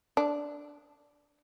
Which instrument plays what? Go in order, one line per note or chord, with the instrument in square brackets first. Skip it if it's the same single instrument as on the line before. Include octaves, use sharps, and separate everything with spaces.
[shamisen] D4